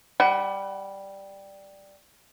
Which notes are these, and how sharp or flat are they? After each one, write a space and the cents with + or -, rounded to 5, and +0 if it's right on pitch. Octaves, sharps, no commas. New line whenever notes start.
G3 +0 F#5 +30